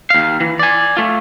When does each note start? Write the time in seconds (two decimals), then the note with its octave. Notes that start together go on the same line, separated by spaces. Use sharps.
0.10 D#2 F5
0.40 E3
0.59 D5 G#5
0.97 A3 F4